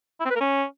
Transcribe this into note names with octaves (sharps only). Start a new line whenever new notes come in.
E4
C4
B4
A#4
C#4